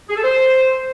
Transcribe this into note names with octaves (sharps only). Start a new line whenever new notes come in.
G#4
A4
C5